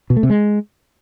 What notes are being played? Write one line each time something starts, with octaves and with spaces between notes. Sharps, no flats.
B2
A3
C3
G#3